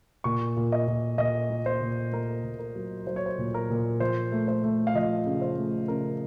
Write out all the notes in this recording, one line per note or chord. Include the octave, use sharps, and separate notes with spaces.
A#2 C#6
A#2
D#5
A#2
A#2 D#5
A#3
C5
A#2
A#3 A#4
A#2
A#4
F#3
F#3 C5
C#5
C5
A#2
A#4
A#2
F3 C5
A3
C5
A3
F5
F3 D#5
C#3
C5
A3
C#3 A#4